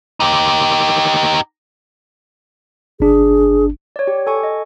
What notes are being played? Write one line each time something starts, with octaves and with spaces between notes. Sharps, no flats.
D#4 G4
G1 D4 G#4
C#5 D5
G4
A4 G#5 C#6
D#5